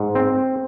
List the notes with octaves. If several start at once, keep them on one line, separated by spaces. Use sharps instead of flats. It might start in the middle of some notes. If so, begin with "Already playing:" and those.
Already playing: G#2
C4